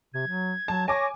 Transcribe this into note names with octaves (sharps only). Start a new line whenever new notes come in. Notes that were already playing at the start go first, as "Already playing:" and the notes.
C3 G#6
F#3
F#3 A5
C#5 G#5 D6 A#6